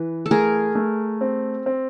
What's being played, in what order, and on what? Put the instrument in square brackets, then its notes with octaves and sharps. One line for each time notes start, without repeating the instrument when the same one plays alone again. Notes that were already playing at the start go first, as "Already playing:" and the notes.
Already playing: [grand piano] E3 [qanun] B4
[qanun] A4
[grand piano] A3 [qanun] G#4 A#4
[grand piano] A3
C4
C4